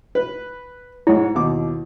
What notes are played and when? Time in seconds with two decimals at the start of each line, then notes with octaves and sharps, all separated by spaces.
0.15 B4
1.07 G#2 G#3 E4 C#5 F#5
1.35 D#2 B2 D6